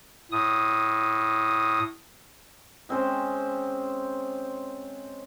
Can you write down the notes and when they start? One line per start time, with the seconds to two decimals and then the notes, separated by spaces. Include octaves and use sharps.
0.31 A2 D#6
2.89 G#3 C4 C#4 C5